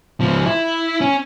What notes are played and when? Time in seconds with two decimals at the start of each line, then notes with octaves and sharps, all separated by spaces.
0.21 C#2 F3
0.46 E4
1.01 C#4